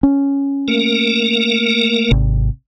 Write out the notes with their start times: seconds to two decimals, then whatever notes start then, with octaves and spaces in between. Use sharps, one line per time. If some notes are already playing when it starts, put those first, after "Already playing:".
0.03 C#4
0.68 A3 A#3 A#4
2.11 G#1 C3